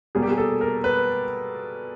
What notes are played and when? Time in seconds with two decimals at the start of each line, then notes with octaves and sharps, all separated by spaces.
0.15 B2 G3 A#3 G#4
0.23 G4
0.31 G#4
0.38 A4
0.61 A#4
0.84 B4